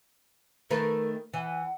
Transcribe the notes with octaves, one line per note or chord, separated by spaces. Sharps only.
D#3 A3 A#4 B4
E3 F#5